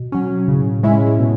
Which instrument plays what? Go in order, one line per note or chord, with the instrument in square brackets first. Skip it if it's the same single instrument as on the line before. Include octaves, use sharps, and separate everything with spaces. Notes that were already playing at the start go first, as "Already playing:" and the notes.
Already playing: [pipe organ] B2
[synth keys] F#3 C#4
[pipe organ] A2 [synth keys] C#3
[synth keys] G#3 C#4 E4
B2